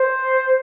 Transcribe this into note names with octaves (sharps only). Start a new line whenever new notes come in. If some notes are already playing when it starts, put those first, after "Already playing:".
Already playing: C5